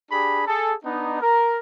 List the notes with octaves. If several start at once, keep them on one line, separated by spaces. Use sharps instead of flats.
D4 G4 G#4 B5
G#4 A4
B3 D4 D#4
A#4